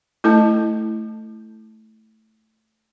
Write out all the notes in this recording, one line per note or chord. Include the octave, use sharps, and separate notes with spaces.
A3 E4 A4 D#5 A5